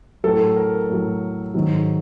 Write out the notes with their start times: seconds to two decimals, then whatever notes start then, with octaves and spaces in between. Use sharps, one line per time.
0.24 A2 F#3 A4
0.56 A#4
0.90 A2 F#3
1.54 G#2 D#3 F#3